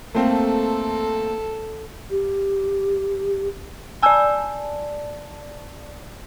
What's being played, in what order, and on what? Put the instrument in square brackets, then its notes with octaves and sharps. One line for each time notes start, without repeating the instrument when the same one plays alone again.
[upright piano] A3 A#3 C4 [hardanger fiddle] A4
[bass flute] G4
[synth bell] D5 A5 [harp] G#5 E6 G6